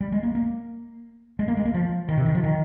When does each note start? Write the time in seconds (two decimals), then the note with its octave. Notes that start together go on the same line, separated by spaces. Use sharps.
0.01 G3
0.12 G#3
0.23 A#3
0.35 A#3
1.39 G#3
1.48 A#3
1.57 G#3
1.65 A#3
1.74 F3
2.09 D#3
2.17 C3
2.26 D#3
2.35 F3
2.44 D#3